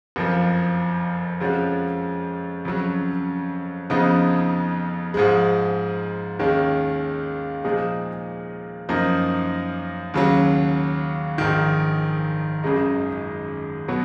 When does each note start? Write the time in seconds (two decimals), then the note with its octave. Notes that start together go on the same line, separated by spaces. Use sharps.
0.16 F#1 F2 F3
1.40 F2 F3 G#3 C#4 F#4
2.65 F2 C#3 F#3 C#4
3.90 F2 C#3 F3 B3 D#4
5.14 G#2 F3 G#3
6.39 D#2 D#3 G#3 C#4
7.64 A#2 F3 G#3 D#4 G#4
8.89 F#2 F3 A#3 D#4
10.14 D#2 C#3 F#3
11.38 A#1 G#2 D#3
12.64 G#1 F#2 C#3 G#3 D#4
13.88 B2 F#3 B3